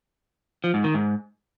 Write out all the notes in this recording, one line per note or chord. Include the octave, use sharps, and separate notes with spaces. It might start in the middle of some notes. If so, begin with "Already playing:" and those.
F3
G#2
D#3
G#2